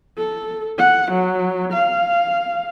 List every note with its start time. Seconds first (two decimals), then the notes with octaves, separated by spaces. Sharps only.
0.17 A4
0.78 F#5
1.11 F#3
1.73 F5